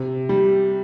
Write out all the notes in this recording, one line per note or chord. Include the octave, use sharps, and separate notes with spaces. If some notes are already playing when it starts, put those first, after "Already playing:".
Already playing: C3
G3